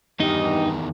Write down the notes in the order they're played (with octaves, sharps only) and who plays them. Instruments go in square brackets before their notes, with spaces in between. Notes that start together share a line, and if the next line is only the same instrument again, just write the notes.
[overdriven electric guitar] E2 D#3 [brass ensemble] G2 G4 D#5 [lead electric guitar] D#4